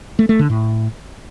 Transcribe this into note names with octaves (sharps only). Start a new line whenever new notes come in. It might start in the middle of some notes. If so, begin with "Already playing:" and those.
A3
A3
D3
A2